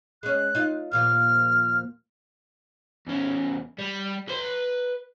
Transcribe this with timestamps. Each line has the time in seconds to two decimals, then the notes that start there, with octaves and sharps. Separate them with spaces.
0.23 G#3 C#4 F#6
0.55 D#4 F4
0.91 D#2 A#2 F3 F6
3.07 E2 C#4
3.79 G3
4.28 B4 C6